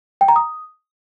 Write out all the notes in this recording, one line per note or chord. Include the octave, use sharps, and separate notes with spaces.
G5
A#5
D#6